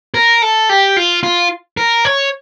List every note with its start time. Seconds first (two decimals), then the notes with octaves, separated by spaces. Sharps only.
0.14 A#4
0.42 A4
0.69 G4
0.97 F4
1.23 F4
1.77 A#4
2.05 C#5